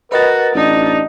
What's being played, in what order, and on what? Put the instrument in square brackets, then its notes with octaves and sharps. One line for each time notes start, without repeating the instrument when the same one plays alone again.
[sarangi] F#4 [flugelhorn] A#4 [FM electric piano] B4 D#5 A6
[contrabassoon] A1 [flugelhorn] D4 [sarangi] D#4